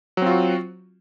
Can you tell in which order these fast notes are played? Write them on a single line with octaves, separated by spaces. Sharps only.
F#3 C4 F4 F#4